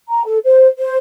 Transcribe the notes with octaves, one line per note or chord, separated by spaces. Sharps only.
A#5
A4
C5
C5